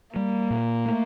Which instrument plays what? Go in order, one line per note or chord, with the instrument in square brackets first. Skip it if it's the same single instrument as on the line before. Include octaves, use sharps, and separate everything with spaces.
[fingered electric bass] G3 [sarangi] A#3
[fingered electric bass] A#2
A3